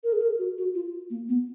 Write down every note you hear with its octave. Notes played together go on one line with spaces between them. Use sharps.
A#4
G#4
A#4
F#4
F#4
F4
A#3
B3